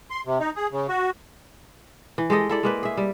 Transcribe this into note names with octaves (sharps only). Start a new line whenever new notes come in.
C6
C3
D#4
G#4
C#3
F#4
E3
G#3 G4 A4 D#5
E4 A4 D5
G#3 A#3 B4
G#4 E5
G3